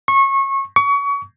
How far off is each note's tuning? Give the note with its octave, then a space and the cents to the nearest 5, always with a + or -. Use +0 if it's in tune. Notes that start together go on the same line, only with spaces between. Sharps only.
C#6 -25
C#6 +30